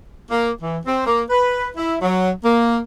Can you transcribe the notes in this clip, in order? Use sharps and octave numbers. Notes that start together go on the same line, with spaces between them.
A#3
E3
C4
A#3
B4
E4
F#3
A#3